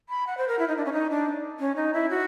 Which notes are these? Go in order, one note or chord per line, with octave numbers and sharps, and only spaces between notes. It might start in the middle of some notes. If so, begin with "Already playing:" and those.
B5
F#5
C5
A#4
E4
D#4
D4
C#4
D#4
D4
C#4
D#4
E4
F#4